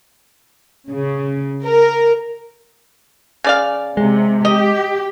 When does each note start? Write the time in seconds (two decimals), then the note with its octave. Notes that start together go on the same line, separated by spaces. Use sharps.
0.88 C#3
1.63 A#4
3.44 C#3 D5 F5
3.97 C3 G#3
4.45 G4 D#5